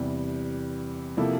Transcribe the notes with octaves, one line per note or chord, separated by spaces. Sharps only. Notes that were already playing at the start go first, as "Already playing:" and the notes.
Already playing: E2 C3 G3
C3 F3 A#3 E4 A4